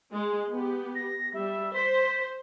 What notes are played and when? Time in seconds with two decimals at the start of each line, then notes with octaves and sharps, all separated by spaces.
0.13 G#3
0.50 B3 G4
0.95 A#6
1.34 G3 E5
1.74 C5 B6